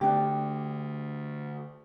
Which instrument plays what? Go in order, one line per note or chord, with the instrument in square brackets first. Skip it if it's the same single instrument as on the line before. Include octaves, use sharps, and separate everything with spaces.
[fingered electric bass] D3 A3 [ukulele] D4 G4